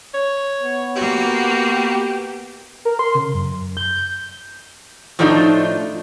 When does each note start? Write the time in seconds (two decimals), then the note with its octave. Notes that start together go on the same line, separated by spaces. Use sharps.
0.14 C#5
0.60 B3
0.96 A#3 F#4 G4
2.85 A#4
2.99 C6
3.15 C#3
3.34 F#2
3.77 G6
5.19 A2 F3 A3 D4 D#4 F4